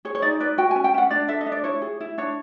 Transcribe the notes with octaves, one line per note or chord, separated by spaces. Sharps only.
G#4 C#5
C#5
D#4 D5
B4 D5
F#4 G5
G#5
C#4
G5
C#4 F#5
D4 D5
A4 E5
D#5
D4
D5
E4 C#5
G#4
E4
D4 C#5